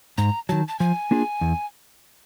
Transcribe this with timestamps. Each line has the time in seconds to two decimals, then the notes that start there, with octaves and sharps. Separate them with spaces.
0.18 G#2 A#5
0.49 D#3 F#3 A5
0.68 A5
0.79 F3 G#5
1.11 A#3 D4 F4 G#4
1.41 E2